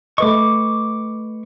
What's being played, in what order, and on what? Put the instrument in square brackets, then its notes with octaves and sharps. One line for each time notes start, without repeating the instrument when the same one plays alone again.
[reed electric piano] A3 B4 D#5 [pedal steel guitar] C#6 D6